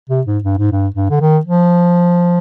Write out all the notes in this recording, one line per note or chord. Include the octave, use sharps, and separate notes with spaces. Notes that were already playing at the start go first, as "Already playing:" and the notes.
C3
G#2
G2
G#2
G2
G2
D3
D#3
F3